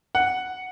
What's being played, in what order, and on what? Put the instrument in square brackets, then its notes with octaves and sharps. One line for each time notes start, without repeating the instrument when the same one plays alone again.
[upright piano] F#5